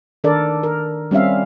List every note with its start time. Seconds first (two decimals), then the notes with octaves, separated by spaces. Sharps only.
0.24 D#3 D4 A4 A#4 D5
0.63 A#4
1.11 G3 C4 C#4 E5 F5